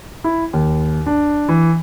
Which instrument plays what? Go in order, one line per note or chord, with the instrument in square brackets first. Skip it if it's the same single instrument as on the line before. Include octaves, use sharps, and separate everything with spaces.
[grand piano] E4
D#2
D4
E3